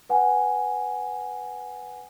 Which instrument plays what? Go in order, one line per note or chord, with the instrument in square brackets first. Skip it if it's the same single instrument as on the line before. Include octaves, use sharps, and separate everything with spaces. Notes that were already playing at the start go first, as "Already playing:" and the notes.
[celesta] B4 F#5 G#5